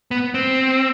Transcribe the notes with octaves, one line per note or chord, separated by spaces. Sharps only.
B3
C4